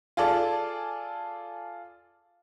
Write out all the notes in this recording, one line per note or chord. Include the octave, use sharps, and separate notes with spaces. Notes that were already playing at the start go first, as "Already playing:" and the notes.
F4 G#4 A4 D5